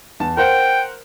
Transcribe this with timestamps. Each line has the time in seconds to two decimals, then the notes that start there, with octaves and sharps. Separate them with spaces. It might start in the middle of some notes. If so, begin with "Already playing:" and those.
0.20 E2 A5
0.37 A#4 C5 F#5 G5